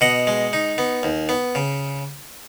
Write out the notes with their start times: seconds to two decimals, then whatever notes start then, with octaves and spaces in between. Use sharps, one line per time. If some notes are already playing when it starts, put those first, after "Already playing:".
0.01 B2 D#5 F#5
0.27 G#3
0.53 D#4
0.78 B3
1.03 D#2
1.29 B3
1.55 C#3